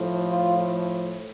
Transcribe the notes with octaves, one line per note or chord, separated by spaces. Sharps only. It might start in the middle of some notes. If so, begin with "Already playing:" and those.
Already playing: A2 F3
F4